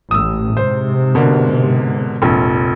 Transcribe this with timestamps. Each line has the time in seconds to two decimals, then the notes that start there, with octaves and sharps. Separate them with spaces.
0.11 A1 A2 D#6 E6
0.57 G#2 C3 C5
1.15 B2 D3 A#3
2.22 F1 A#1